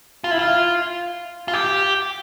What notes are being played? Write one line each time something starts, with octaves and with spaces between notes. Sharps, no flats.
F4
E4
F4
F4
G4